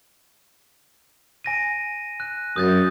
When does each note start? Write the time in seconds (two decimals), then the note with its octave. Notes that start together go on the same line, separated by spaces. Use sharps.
1.44 G#5 A#6 D#7
2.20 F#6
2.56 F#2 D#6 G6 A6